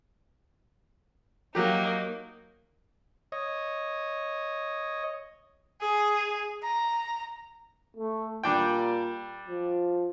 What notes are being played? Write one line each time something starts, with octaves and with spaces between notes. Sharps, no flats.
F#3 A#3 D#4 G4
C#5 D#5
G#4
A#5
A3
A#2 G3 D4 G5
F3